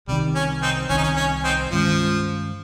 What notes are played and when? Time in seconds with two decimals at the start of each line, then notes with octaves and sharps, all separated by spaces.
0.08 C2 C3 D#3 G3
0.35 C#4
0.62 C4 D#4
0.89 C2 C3 D#3 C#4
0.97 D#4
1.03 C#4
1.17 C#4
1.44 C4 D#4
1.71 G2 D#3 F3 G#3 C#4